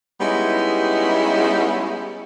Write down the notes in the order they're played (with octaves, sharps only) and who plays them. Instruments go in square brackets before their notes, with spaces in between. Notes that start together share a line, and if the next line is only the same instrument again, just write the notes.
[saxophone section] G3 G#3 B3 C#4 D#4 E4